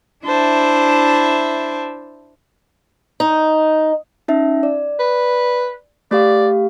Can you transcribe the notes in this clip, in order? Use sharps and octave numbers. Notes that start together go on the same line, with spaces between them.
D4 E4 C5 E5 A5
D#4
C#4 D#4 E5
D5
B4
A3 G4 D5 F5